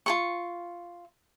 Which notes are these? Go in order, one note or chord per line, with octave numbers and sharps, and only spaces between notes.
F4 G#4 C#6